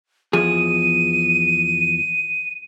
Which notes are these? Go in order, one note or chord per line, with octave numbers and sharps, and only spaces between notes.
E2 F3 G#4 D#7